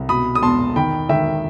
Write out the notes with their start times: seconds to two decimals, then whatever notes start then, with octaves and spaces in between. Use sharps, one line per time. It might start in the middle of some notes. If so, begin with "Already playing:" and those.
Already playing: C2
0.09 B2 B5 D#6
0.35 D#6
0.43 E2 A5 C6
0.76 D#3 G5 B5
1.09 D#3 E5 G5